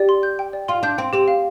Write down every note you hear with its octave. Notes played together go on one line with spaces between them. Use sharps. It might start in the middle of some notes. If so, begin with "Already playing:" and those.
Already playing: G4 D5
C6
G6
G5
D5
F4 C6
D4 G6
C4 G5
C4 G4
F5